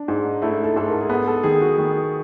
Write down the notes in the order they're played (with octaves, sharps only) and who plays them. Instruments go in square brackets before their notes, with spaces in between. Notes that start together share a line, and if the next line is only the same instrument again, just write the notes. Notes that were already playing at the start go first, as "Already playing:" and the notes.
Already playing: [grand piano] D4
[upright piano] G#2 [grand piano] D#4
[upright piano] A3 [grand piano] E4
[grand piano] A4
[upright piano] G#2 [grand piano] A4
[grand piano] A#4
G#4
[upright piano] B3 [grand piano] A4
[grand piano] A4
[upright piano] D#3 [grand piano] G#4
[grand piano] F#4
[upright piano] D#3